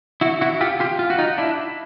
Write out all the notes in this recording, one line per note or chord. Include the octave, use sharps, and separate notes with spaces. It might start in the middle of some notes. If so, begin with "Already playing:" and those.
E4 F#4
E4 F#4
F4 G4
F4 G4
F4
F#4
D#4 F4
D4 E4